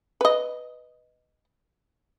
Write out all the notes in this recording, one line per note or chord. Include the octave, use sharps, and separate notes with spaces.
B4 D#5